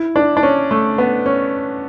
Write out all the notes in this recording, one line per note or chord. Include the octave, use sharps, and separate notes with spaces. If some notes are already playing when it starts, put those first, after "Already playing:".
Already playing: E4
D4
D4
C#4
A3
B3
C#4